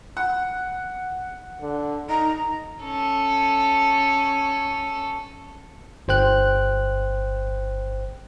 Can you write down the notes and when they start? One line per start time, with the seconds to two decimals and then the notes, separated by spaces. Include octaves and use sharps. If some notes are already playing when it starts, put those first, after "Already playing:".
0.17 F#5
1.61 D3
2.09 D#4 A#5
2.83 C#4 A4
6.08 G1 C5 G5 F#6